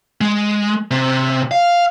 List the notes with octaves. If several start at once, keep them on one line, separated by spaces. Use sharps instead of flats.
G#3
C3
F5